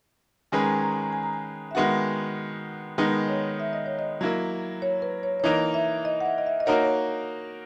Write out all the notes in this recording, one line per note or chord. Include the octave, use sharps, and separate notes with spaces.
D#3 G#3 C#4 G#4 B4 G#5
A#5
G#5
A#5
G#5
A#5
G#5
A#5
G#5
E5
D#3 G#3 B3 F#4 F#5
D#3 G#3 B3 D#4 D#5
C#5
E5
D#5
C#5
D#5
F#3 A#3 E4
C#5
B4
C#5
C#5
E3 A#3 D#4 A#4 D#5
E5
D#5
F#5
E5
D#5
E5
D#5
A#3 D#4 F#4 A#4 C#5
C#5